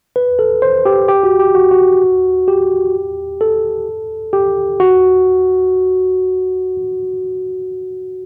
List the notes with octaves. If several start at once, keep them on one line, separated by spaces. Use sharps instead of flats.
B4
A4
C5
G4
G4
F#4
G4
F#4
F#4
G4
A4
G4
F#4